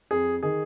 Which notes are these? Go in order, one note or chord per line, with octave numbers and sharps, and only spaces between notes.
F2 G#4
D#3 G#4